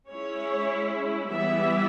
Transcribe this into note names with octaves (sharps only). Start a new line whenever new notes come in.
G#3 C#4 E4 C#5
E3 G3 B3 E4 E5